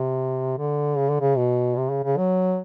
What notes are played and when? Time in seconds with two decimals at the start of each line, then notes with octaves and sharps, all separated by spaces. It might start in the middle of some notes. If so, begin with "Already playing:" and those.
Already playing: C3
0.57 D3
0.97 C#3
1.09 D3
1.21 C#3
1.37 B2
1.77 C3
1.91 C#3
2.04 C#3
2.17 F#3